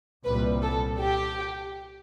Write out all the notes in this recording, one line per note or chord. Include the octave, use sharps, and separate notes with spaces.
C2 A#2 G3 B4
A4
G4